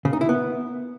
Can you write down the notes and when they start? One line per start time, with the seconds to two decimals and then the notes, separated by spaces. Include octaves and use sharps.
0.05 C#3
0.13 D#4
0.21 E4
0.29 B3